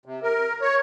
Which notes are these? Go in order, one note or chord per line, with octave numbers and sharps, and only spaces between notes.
C3
A#4
C#5